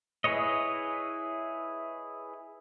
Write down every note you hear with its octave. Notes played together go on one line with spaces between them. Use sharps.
E4 G#4 B4 C#5 D#5